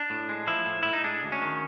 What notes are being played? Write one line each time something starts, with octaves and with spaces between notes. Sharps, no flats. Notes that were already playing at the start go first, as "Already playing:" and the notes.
Already playing: D4
A2
G#3
F3 E4
A2
A2 E4
D#4
G#3 D4
D2
C#4
D#3